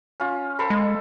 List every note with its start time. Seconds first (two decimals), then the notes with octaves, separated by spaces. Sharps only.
0.20 C#4 F4
0.59 A4 C5 B5
0.70 G#3